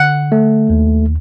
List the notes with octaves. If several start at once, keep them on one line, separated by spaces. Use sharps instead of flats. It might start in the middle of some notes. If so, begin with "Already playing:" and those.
Already playing: D3 F#5
A3
D#2